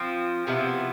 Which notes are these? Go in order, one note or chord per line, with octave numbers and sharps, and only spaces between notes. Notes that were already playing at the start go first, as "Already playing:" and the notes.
Already playing: F3 C4
C3 F3 B3 E4